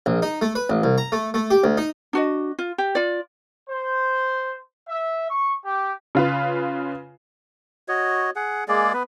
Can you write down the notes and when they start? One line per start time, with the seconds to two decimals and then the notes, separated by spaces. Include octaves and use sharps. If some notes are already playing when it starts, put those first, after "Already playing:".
0.06 A#1
0.22 D#4
0.42 A3
0.55 B4
0.70 A1
0.83 C2
0.98 A#5
1.12 A3
1.34 A3
1.51 G4
1.64 D2
1.78 D#4
2.13 D4 F#4 D#5
2.59 F4
2.78 G4
2.95 F4 D5
3.68 C5
4.87 E5
5.29 C#6
5.64 G4
6.15 C#3 F4 B4
7.88 F#4 C#5 D#5
8.36 G#4 F#5
8.68 G#3 A#3 G#4 D5
8.94 B3 B4